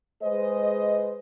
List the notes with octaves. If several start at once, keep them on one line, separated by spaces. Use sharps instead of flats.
G#3 G#4 B4 C5 D#5